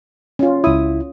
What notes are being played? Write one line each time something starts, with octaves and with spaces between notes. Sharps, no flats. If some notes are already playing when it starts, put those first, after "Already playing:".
C#4 F4
C#2 E4 D#6